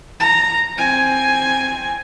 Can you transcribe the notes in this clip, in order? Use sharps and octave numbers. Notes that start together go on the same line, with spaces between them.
A#5
C4 G#5